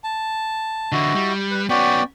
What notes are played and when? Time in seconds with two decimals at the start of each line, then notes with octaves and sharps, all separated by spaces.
0.04 A5
0.92 D3 E3 E4 F#4 D#5
1.15 G3
1.51 B4
1.70 B3 C#4 F#4 D5 G5